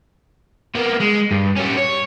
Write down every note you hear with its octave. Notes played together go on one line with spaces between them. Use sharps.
A#3 B3
G#3
G2
G3 C#4
C#5